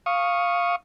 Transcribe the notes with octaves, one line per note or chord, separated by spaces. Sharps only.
F5 C#6 D#6